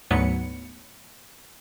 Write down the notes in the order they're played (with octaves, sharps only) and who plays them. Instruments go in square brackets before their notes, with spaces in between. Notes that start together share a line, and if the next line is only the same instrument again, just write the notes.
[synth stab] D2 G#2 F#3 B3 C#7